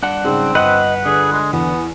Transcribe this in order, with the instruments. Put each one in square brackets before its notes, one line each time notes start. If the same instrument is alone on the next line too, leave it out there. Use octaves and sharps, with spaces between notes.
[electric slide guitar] G2 D4 F#5 [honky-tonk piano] F#6
[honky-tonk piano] G#2 C#3 [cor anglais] C4
[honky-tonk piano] G1 [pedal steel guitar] B4 F#5 [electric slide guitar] D#5
[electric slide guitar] D3 [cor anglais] G#4
[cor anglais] G#3
[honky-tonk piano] E2 [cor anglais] B3